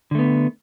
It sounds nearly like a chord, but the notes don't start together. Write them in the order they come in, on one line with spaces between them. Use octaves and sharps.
D3 A3 B3